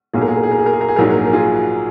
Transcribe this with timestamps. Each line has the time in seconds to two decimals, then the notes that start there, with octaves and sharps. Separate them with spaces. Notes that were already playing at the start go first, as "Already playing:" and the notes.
0.13 B1 A#2 F#3 G#4
0.21 A#4
0.28 G#4
0.36 A#4
0.43 G#4
0.51 A#4
0.59 G#4
0.66 A#4
0.73 G#4
0.81 A#4
0.88 G#4
0.96 A#1 G#2 F#3 A#4
1.04 G#4
1.11 A#4
1.19 G#4
1.26 A#4
1.33 F4 G#4